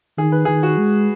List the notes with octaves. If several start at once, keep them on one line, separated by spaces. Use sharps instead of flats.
D#3 G#4
B4
D#3 G#4
F#4
G#3